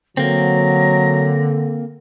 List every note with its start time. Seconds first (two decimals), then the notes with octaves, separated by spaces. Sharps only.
0.17 D3 F#3 A#3 C4 A#6